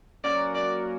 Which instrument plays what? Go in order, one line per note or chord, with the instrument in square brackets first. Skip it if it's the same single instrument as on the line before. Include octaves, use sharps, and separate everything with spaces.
[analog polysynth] F#3 A#3 C#4 F#4 A#4 [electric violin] D5
[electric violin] D5